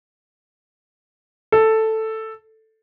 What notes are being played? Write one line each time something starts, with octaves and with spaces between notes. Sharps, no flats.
A4